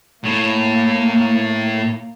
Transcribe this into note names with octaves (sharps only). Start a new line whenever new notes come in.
A2 A#3